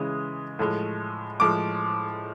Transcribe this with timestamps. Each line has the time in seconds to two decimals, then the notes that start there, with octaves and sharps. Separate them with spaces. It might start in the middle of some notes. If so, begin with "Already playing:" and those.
Already playing: C#3 E3 G#3 D#6
0.59 A2 F3 G#3
1.40 A2 F3 G#3 D6